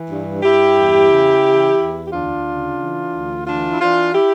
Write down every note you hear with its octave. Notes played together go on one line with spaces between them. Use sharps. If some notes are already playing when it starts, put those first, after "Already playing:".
Already playing: E3
G2
G2 E4 G4
E2
C#3
E3
E2
G4
D2 D4 F4
C#3
E3
D2
E3 D4 F4
E4
E3 D4 F4
E4 G4